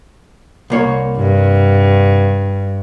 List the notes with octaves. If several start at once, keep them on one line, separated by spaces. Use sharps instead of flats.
C2 A#3 C#5
G2